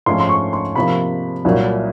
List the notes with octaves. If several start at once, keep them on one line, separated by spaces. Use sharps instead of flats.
G#2 F3 A3 C#4 C6
C6
C#6
C6
C3 F3 A#3 B5
C2 A#2 F#3